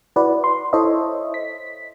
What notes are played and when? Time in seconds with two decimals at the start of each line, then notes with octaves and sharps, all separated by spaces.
0.16 E4 F#4 B4 D5
0.44 C6
0.73 E4 A4 C5 C#5 D#5 E5
1.34 B6